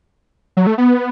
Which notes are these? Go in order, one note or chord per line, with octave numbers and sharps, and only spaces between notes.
F#3
A3
B3